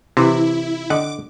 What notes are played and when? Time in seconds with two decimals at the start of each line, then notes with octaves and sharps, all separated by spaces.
0.17 C3 E3 E4
0.90 D3 D#5 F#5 D6